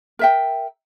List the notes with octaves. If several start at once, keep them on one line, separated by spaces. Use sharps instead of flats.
A#4 E5 G5